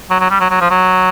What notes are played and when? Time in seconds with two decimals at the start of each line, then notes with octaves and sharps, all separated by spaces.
0.10 F#3
0.20 F#3
0.30 G3
0.40 F#3
0.50 F#3
0.61 F3
0.70 F#3